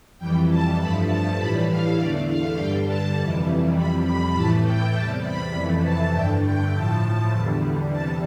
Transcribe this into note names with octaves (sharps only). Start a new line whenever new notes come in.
F2 E3 G3 G5
A5
G2 F3 A3 B5
A5
A2 E3 G3 B5
F5
E2 D3 A3 D5
F5
G2 D3 G3 G5
A5
F2 C3 E3 G3
F2 C3 G3 B5
B5
A2 E3 A3 A5
G5
E2 C3 G3 A5
B5
F2 C3 E3 A3
A5
G2 D3 A3 G5
G5
A2 F3 A3 A5
E2 D3 G3
E2 C3 G3 A5